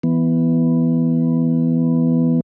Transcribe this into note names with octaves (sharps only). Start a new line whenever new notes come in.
E3 B3